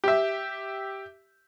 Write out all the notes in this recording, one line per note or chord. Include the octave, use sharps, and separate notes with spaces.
G4 E5